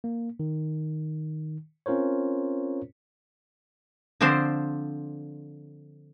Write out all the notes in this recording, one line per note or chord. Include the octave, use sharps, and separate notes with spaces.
A#3
D#3
C4 C#4 F4 A#4 C5 C#5
D3 F3 C4 D4 C5